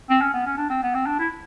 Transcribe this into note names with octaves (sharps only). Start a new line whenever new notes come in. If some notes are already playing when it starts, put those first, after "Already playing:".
C4
C#4
B3
C#4
D4
C4
B3
C4
D4
E4